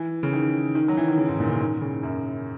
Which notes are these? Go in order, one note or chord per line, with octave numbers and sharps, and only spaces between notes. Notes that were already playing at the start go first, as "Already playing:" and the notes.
Already playing: E3
C#3
D#3
D#3
F#3
E3
D#3
C#3
G#2
A#2
C#3
D#3
C#3
F#2